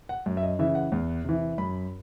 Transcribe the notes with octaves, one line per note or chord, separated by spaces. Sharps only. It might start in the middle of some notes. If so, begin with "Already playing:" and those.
F#5
F#2
E5
D#5
C#3 E3 E5
F#5
E2
C3 E3
F#2 B5